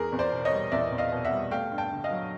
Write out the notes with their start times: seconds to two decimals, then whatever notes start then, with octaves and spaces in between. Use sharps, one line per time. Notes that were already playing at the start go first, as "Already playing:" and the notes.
Already playing: E2 G#4 A#4
0.12 E2
0.19 C5 D5
0.32 B2
0.45 C#5 D#5
0.52 G3
0.72 E2 D5 E5
0.92 E2
0.98 D#5 F5
1.12 B2
1.25 E5 F#5
1.31 G3
1.51 A3 F5 G5
1.71 G2
1.78 G5 A5
1.91 D3
2.04 D#5 F5
2.11 F#3